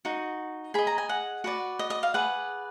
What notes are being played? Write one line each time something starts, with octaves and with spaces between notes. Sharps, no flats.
D#4 F#4
G#4 D#5 B5
A#5
G#5
F#5
F#4 B4 D5
D#5
D#5
F5
G#4 B4 D5 F#5